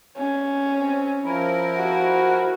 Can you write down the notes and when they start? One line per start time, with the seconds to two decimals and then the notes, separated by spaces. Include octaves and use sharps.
0.17 C#4
0.78 C4
1.25 F3 E4 A#4
1.77 F#4